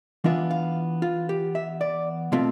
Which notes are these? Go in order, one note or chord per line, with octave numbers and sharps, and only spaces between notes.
E3 B3 D4 F4 E5
F5
F4
G4
E5
D5
B2 A3 C4 F4